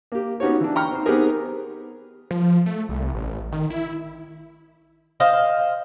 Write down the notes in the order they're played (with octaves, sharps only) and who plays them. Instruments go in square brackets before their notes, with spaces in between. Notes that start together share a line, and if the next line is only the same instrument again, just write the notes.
[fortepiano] A#3 G4
B3 C#4 D#4 F#4 G4 C#5
E3 D4
G5 A#5 B5 C#6 F6
C4 D#4 C5
B3 C4 D#4 G4 G#4 A#4
[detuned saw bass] F3
A3
C2
A1
D#3
E4
[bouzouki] C5 D#5 F5